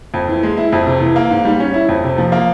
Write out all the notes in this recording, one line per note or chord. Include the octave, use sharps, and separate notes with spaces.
F2
E3
G#3
E4
F2
C3
E3
A#3
G#2
G3
C#4
E4
F2
C3
F3
A#3